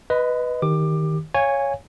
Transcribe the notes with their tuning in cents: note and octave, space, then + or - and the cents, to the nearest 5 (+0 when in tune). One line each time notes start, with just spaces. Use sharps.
B4 +0 D#5 +0 B5 +45
D#3 +0 G4 +0 D6 +20
C#5 +0 F5 +0 G#5 -15